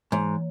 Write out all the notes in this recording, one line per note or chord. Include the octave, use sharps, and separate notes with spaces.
G#2 E3